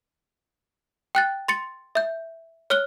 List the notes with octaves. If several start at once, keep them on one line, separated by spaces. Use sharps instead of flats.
G5 F#6 A6
C6 A6 C#7
E5 G6
C#5 F6 F#6 G7